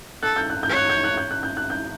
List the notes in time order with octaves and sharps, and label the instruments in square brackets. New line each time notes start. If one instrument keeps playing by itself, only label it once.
[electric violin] A4 [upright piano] F#6
[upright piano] G6
F#6
G6
[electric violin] C#5
[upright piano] F#6
G6
F#6
G6
F#6
G6
F#6
G6